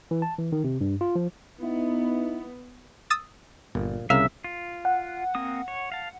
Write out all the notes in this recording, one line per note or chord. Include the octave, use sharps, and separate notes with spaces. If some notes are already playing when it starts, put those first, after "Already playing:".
E3
A5
E3
D#3
C3
G2
F4
F3
B3 D#4 E4
D#6 E6 A6
G1 A#2
C2 C#3 A#4 E5 F5
F4
F#5
A#3 C4 D#6
C#5
F5 A5